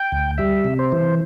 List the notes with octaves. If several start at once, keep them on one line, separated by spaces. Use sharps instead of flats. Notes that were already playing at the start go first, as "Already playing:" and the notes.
Already playing: G5
D2
G3 E5
C3
C5
E3